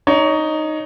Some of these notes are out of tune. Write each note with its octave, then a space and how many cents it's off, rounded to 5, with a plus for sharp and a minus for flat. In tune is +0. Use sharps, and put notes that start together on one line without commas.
D#4 -5 C#5 +20